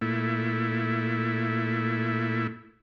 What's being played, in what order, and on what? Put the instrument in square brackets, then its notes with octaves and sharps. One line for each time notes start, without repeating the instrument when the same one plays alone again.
[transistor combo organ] A#2 A3 E4